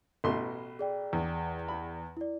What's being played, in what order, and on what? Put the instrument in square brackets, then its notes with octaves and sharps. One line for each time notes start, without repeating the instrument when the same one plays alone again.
[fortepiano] A1 B2 C6
[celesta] G#4 D5 G5
[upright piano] E2
[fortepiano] B5
[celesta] E4 D5